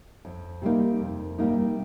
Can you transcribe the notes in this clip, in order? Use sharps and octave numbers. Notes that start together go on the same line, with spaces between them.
F2
C3 G3 A#3 D#4
F2
C3 G3 A#3 D#4